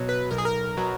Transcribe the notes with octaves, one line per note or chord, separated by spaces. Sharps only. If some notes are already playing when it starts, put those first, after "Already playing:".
Already playing: B2 F#3
B4
B1 A#4
G#4
A#4
B2 F#3